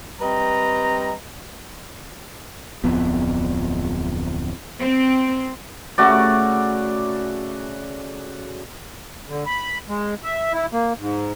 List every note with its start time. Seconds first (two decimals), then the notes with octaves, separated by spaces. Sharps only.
0.21 G3 C4 B4 D#5 A#5
2.84 D1 F2 B3
4.80 C4
5.98 C#3 A3 F#4 D5
9.29 D3
9.46 B5
9.89 G#3
10.24 E5
10.53 E4
10.73 A#3
11.00 G#2